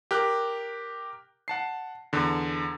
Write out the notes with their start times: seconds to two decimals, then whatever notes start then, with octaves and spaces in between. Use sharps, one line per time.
0.11 G4 A#4 F#6
1.48 F#5 A5 C7
2.13 E2 D3